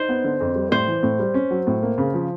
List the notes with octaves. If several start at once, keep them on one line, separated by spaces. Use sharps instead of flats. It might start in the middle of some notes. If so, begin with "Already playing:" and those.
Already playing: D#4 C5
B3
D3
F2
G3
A2 C5
E3
A2
G3
C#4
F#3
A2
A#3
C#3
F3